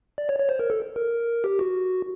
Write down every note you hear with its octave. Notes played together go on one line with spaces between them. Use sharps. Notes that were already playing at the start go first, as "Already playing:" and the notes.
D5
C#5
C#5
C5
A#4
A4
A#4
G4
F#4